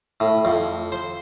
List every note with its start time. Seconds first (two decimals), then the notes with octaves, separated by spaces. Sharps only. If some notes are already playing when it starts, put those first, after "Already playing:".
0.20 A2
0.45 F2
0.92 C5